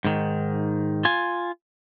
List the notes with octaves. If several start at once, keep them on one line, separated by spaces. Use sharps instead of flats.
G#2 D#3
F4 G#5